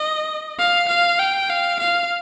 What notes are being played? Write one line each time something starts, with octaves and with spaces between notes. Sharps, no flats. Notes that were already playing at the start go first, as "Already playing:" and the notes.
Already playing: D#5
F5
F5
G5
F5
F5